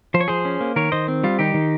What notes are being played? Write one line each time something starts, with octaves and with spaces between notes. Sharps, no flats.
F3 C5
C#5
F3 G#4 C5
C#4
A#3
D#3 A#4 C#5
D#3 C5 D#5
C4
G3 F4
D#3 D#4 G4
D#3